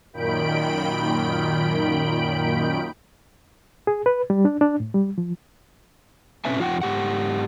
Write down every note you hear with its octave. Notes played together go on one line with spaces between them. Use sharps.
F#2 A#2 D#3 G5 B5 D7
G#4
B4
G3
D4
D4
A2
G3
F3
B2 C4 C#4 B4 E5 G#5
F2 F4 F#4 F#5 G5
G#2 G4 F#5